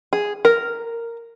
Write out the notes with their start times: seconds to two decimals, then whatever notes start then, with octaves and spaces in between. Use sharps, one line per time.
0.13 G#4
0.45 A#4